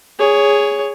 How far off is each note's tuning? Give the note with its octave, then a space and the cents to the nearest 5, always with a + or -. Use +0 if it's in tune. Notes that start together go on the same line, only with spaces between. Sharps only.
G#4 -5 C#5 +10